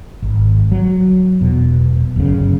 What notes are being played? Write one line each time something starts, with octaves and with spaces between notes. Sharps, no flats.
G#1
F#3
E1 B2
G1 F#2 A2 C#3